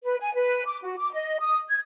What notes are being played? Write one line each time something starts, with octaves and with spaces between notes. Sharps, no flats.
B4
G#5
B4
D6
F#4
D6
D#5
D#6
G#6